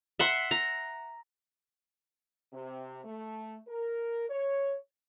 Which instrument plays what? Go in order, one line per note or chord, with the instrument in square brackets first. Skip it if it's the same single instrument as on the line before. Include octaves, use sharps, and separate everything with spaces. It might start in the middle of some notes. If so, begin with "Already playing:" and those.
[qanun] E5 F#5 C6
A#5
[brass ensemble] C3
A3
A#4
C#5